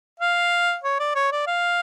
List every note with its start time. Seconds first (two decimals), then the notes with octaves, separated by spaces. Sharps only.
0.20 F5
0.84 C#5
0.99 D5
1.15 C#5
1.32 D5
1.47 F5